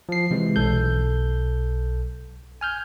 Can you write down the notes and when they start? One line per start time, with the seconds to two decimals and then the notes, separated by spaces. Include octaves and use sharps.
0.09 F3 C7
0.31 C3 E3 G#3
0.56 B1 A4 G6
2.61 G#5 F6 G6